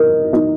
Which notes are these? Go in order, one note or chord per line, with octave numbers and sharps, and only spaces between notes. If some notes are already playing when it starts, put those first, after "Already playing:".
Already playing: D#4 A#4
D#4